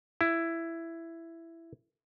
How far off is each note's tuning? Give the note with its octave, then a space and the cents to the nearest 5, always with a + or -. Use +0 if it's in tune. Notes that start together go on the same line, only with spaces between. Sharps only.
E4 +10